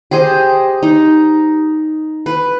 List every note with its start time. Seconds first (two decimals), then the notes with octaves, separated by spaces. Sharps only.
0.11 G4 G#4 C5 D#5
0.83 D#4
2.26 B4